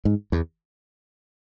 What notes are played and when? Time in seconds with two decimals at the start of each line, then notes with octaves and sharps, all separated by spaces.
0.05 G#2
0.32 E2